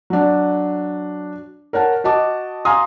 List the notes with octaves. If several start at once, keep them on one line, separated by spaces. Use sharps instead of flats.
F#3 D4
A#4 C#5 F#5 A5
F#4 D#5 A5 D6
F5 G#5 A#5 C6 D#6